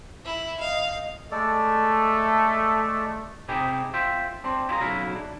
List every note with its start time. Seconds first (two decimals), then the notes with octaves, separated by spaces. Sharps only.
0.25 E4
0.59 D#5 F5
1.31 G#3 A3 A4 D5
3.48 C3 C4 D#4 E4 G4 G#4
3.93 F4 C5 E5 G5
4.44 C4 D4 C5
4.69 E4 F4 G#4 A#5
4.81 B1 C#3 F#3 E4 F5
5.15 D4